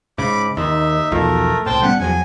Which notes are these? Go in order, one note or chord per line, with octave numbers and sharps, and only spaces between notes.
G#2 C#3 B5 D6
D#2 D#4 E5
B1 E2 F3 A3 A#4
C2 A2 C5 G5 A5
G3 B3 C#4 F#5
E2 F3 F#3 G#5